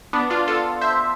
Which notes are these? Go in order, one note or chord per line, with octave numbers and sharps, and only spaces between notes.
B3 D4
D4 F4
F4 A4
C5 E5